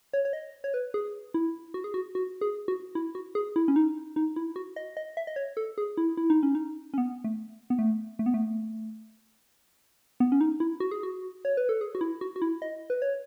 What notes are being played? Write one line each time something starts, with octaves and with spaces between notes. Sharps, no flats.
C#5
C#5
D#5
C#5
B4
G#4
E4
F#4
G#4
F#4
F#4
G#4
F#4
E4
F#4
G#4
E4
C#4
D#4
D#4
E4
F#4
D#5
D#5
E5
D#5
C#5
A4
G#4
E4
E4
D#4
C#4
D#4
C#4
B3
A3
B3
A3
A3
B3
A3
B3
C#4
D#4
E4
F#4
G#4
F#4
C#5
B4
A4
G#4
F#4
E4
F#4
F#4
E4
D#5
B4
C#5